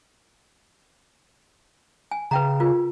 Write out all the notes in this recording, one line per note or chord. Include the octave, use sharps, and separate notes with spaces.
G#5
C#3 B4 G5 A#5
F4 A#4